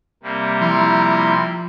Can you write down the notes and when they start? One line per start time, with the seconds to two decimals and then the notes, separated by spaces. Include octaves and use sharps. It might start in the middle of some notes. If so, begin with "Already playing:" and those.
0.23 C3 G3 A#3
0.61 F3 E4 A#5 C6